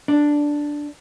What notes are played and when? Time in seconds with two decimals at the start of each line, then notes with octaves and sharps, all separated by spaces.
0.08 D4